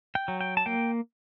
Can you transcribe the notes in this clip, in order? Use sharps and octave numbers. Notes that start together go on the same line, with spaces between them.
G5
F#3
G5
A5
A#3 G5